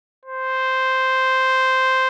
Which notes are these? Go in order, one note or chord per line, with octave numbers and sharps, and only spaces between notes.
C5